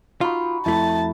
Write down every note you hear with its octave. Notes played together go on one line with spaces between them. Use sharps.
D#4 F4 F#4 B5
F2 A3 E4 A5